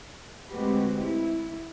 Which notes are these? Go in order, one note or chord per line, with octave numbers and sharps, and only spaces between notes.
D2 G#3 C4 F#4 G4 B4
E4